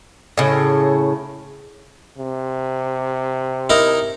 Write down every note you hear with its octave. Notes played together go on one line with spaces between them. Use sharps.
A2 C#3
C3
D#4 E4 A#4